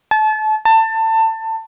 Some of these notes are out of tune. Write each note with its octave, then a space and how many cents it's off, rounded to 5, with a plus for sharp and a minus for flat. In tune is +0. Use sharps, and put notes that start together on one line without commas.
A5 -30
A5 +25